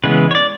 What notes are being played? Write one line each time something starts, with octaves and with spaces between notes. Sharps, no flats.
C#3 E3 G#3 B3 B4
C#5
D5